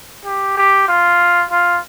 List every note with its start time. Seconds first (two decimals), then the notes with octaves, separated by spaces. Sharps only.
0.25 G4
0.57 G4
0.88 F4
1.51 F4